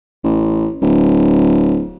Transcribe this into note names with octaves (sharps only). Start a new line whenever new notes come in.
A1
D1